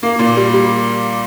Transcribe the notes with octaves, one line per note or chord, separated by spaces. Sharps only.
A#3
A#2
G3
G3